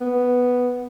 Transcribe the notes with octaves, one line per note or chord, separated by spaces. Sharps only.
B3